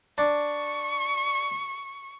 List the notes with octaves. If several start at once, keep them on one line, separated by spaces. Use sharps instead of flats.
D4 C#6